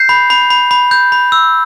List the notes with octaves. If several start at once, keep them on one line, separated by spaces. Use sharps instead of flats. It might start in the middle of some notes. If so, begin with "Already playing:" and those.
Already playing: G6 C7
B5
B5
B5
B5
G6
B5
E6